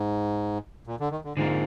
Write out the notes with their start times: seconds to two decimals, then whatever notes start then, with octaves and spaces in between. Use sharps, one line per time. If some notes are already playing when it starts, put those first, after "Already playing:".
Already playing: G#2
0.87 A#2
1.00 D3
1.12 D#3
1.24 D3
1.36 G#2 D3 F3 A#3